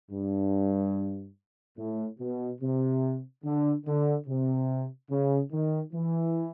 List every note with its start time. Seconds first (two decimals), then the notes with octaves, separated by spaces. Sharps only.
0.11 G2
1.78 A2
2.20 B2
2.61 C3
3.44 D3
3.86 D3
4.27 C3
5.10 C#3
5.52 D#3
5.93 E3